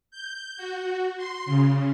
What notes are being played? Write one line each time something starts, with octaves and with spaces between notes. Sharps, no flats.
G6
F#4
C6
C#3